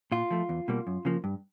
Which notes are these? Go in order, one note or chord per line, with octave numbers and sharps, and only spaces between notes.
A#2 F4
F3 A3
E2
B2 G3 A#3
F#2
C#3 F3 A#3
G2